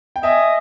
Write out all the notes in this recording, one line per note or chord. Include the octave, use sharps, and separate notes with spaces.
G5
D#5 E5 G#5